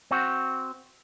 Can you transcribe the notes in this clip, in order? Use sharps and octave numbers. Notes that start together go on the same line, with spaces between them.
C4 F#4